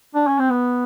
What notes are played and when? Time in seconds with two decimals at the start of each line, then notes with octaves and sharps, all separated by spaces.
0.15 D4
0.27 C#4
0.39 C4
0.50 B3